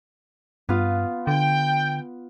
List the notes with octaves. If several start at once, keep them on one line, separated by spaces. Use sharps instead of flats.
G2 B3 F4
D3 G5